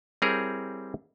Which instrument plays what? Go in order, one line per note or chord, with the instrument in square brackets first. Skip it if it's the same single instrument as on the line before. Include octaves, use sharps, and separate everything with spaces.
[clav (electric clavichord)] G3 C4 E4 G#4 A#4 C#5